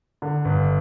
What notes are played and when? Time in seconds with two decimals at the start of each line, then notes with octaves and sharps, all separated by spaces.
0.22 D3
0.45 G1